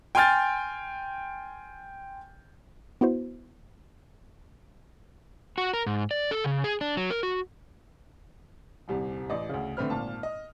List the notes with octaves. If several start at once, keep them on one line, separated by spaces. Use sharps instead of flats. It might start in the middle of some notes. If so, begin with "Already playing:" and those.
G5 G#5 C6 F6 G6 A6
B3 E4 F#4 C5
F#4
A#4
G#2
D5
A4
C#3
G#4
D4
F#3
A#4
F#4
D#1 C2 C3
A1 D5 D#5
D2 C#3
D3 A3 C4 B4 F6
G#1 A#2 A5
D#5